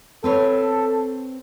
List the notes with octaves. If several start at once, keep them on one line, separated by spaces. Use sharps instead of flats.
C4 A4 B4 C#5